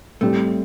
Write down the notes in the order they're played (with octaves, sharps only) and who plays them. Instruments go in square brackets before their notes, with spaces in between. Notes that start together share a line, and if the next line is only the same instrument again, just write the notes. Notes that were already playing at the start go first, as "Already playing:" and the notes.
[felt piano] A2 G3 C4 G4 [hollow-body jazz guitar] A3